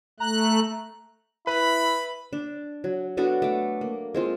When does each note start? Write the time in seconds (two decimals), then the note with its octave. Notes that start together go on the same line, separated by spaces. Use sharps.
0.20 A3 A#5 F#6
1.47 E4 B4 B5
2.33 D4
2.84 F#3
3.17 B3 D4 F#4 A4
3.42 A3 D6
3.81 A#3
4.14 G#3 C4 F4